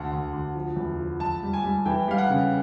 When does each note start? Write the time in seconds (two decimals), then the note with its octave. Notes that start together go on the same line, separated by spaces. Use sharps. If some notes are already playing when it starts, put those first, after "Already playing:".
Already playing: D2 F#5
0.12 D2
0.33 D2
0.55 F3
0.76 E2
0.99 F3
1.20 F2 A5
1.43 G3
1.53 G#5
1.63 G3
1.86 E3 G5
2.08 G3 F5
2.18 F#5
2.29 C#3